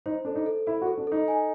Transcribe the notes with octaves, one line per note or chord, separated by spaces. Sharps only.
D#4 C5
D4 A4
D#4
A4
E4 A4
F#4
A4
D4
D#4 A4
G#5